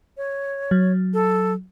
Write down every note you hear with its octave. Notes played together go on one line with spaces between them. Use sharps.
C#5
F#3
A4